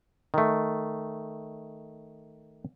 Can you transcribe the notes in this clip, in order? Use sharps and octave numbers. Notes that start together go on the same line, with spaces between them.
D#3 A3